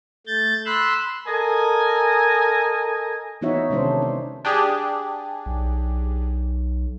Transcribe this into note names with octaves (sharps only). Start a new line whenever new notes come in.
A3 G6 A6
B5 C6 E6 F#6
A4 A#4 D#5 G#5
E3 B3 D#4 F#4 C#5 E5
C3 D#3 G#3 C#4 D4 C5
D4
D4 G4 G#4
B1